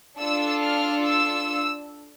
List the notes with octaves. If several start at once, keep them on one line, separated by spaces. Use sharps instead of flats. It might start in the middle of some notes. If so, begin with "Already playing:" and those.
D4 F4 A4 E6
F6
E6